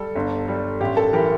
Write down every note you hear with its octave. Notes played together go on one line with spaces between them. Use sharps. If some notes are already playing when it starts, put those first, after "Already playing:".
Already playing: G3 A4
G1
G3
A1 G4
A4
E3 G4 A#4